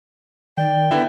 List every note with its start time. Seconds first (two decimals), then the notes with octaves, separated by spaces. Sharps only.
0.58 D#3 D5 G5
0.91 D3 B3 E4 E5